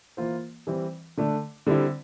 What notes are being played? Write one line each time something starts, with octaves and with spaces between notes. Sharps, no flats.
E3 A#3 F4 C5
E3 G3 C4
D3 A3 D4
D3 G3 C4 E4